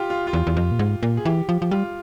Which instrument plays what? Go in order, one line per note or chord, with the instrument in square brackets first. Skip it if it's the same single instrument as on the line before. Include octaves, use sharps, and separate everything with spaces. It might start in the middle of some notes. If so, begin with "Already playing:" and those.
Already playing: [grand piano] F4 G4
F4
F4
[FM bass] E2
E2
F2
A#2
G#2
A#2
[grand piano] G#4
[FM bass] E3 [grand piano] G4
[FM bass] F3
F3
[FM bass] G3 [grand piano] F4